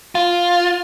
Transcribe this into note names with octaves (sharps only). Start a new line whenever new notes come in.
F4